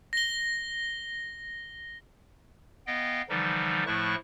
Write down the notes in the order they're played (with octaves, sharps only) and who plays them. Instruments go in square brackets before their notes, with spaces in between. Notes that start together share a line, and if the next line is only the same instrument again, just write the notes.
[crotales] A#6 G7
[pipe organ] B3 D#5 F5 G5
D3 E3 F3 G3 D#4
A2 F3 A3 E4 C#6 F#6